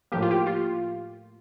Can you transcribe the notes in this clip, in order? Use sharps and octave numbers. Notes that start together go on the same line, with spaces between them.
A2 F3 A#3 G4
F4
G4
F4